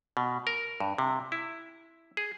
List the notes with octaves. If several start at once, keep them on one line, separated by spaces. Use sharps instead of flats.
B2
A#4
G2
C3
E4
G#4